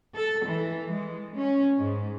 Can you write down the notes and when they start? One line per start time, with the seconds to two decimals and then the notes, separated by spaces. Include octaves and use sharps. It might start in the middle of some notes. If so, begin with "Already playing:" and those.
0.15 A4
0.47 E3
0.91 G#3
1.37 C#4
1.78 G#2